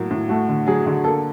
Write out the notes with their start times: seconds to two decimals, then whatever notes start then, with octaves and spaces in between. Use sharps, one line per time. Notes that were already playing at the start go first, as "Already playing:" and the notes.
Already playing: A2 F#3 A#3
0.11 A2
0.29 A3 F#4
0.48 D3
0.67 F#3 G#4
0.86 D3
1.04 A#3 A4